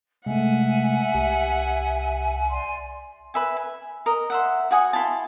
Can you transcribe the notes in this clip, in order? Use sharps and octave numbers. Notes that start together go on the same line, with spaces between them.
C3 G#3 A3 E5 F#5 G#5
C2 G4
D5 G#5 C6
B4 E5 G#5
G#5
A#4 D#5
C5 E5 F#5
F#4 F#5 G#5 D#6
E4 F4 G#5 A5